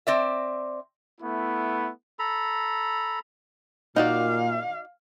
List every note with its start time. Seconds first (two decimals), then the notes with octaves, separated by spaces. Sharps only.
0.07 C4 D5 E5
1.21 A3 B3 E4
2.19 A4 A#5 B5
3.96 A#2 D#4 F#4 D5 F5